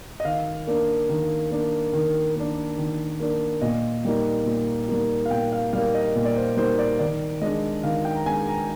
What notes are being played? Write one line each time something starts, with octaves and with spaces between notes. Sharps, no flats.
D#5
D#3 F5
A#3 D4
D#3
A#3 D4
D#3
A#3 D4
D#3
A#3 D4
A#2 D#5
G3 A#3 D#4
A#2
G3 A#3 D#4
F5
A#2 G5
F5
G3 A#3 D#4 F5
D#5
A#2
D5
C5
G3 A#3 D#4 C5
D5
D#3 D5
G#3 D4 D#5
D#3 F5
G5
A#5
G#3 D4 G#5
A#5